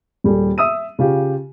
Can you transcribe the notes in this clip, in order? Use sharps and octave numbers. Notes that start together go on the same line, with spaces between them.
D#1 G3 G#4 A4
E5 D#6 E6 D#7
C#3 F4 G4